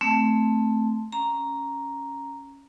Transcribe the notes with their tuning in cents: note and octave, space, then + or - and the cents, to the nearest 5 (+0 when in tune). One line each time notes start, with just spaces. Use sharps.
A3 +0 C4 +0
C#4 +0 A#5 +0